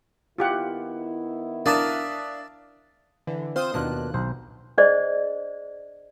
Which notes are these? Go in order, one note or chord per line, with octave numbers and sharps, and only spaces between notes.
D#3 B3 E4 F4 G4 F#5
D4 A#4 D5 E5 F5 A5 D#6
D3 E3
C4 F4 C5 C6 D#6
D#2 B2 D#3 D4 F4 F#6
B1 C5
D4 G#4 C5 D5 D#5